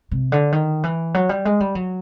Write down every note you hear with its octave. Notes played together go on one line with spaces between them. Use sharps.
C3
D3
D#3
E3
F#3
G3
G#3
G3
F#3